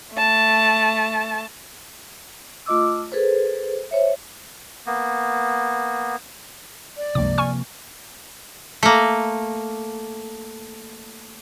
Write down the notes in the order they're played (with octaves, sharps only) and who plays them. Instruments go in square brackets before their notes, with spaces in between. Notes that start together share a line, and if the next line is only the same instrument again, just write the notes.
[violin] A3 A5
[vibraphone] A3 F4 D#5 D6 E6
G#4 A4 B4 C5
C5 C#5 E5
[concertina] A#3 B3
[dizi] D5
[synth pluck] C#2 G2 D6 [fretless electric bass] C3 F3 A#3
[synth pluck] G#5 C#6 F6
[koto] A3 A#3